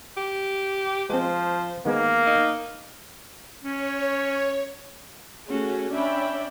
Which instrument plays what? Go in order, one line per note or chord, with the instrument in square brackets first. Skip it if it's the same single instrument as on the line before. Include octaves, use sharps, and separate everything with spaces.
[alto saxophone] G4
[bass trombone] F3 [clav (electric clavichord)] G#3 C4 [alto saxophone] C5
[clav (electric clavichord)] D#3 G#3 B3 [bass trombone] A#3
[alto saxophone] D#4
[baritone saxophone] C#4 [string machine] C#5
[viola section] A3 C#4 F#4 G#4
C#4 D4 D5 E5 G5 B5